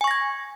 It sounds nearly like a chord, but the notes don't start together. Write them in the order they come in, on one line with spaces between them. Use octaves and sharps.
G#5 C#6 A#6 G#6